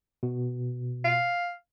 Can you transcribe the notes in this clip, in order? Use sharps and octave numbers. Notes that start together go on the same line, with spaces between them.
B2
F5